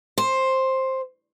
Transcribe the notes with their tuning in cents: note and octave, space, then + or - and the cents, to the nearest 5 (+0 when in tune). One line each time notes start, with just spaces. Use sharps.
C5 +10